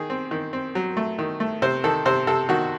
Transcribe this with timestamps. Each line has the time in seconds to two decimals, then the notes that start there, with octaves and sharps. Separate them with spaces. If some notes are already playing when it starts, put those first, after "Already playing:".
Already playing: D#3 G#4
0.10 C4
0.31 D#3
0.53 C4
0.75 F#3
0.97 A3
1.19 D#3
1.40 A3
1.62 C3 C5
1.84 D#3 A4
2.05 C3 C5
2.27 C3 A4
2.49 D#3 F#4